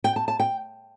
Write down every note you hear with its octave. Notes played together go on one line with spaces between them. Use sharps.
G5
A5
A5
G5